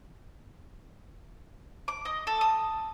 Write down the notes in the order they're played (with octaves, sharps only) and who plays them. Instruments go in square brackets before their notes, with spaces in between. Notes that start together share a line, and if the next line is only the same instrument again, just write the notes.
[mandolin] D6
D#5
A4
D#6